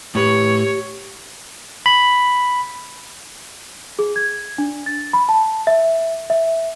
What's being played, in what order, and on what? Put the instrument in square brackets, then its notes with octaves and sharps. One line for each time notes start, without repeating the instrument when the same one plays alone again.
[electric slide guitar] A2 B4 [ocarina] G4 [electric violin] C#5
[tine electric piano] B5
[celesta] G#4
G#6
D4
A6
B5
A5
E5
E5